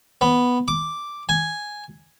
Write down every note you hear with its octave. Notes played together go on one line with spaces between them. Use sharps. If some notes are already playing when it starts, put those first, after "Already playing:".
B3
D6
G#5